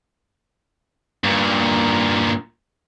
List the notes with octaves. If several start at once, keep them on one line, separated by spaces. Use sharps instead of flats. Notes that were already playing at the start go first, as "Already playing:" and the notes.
G2 A#2